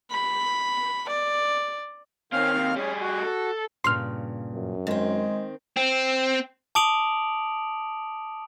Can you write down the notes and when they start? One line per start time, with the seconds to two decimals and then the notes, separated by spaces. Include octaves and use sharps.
0.11 B5
1.09 D5
2.33 D#3 C4 C#4 F5 F6
2.55 D#2 C3
2.76 G3 C#4 G#4
3.01 F#4
3.23 A4
3.84 G2 A#2 C#3 C6 F6
4.54 F#2
4.87 D#3 G#3 C4
5.76 C4
6.75 A5 D6 D#6 D7 F7 F#7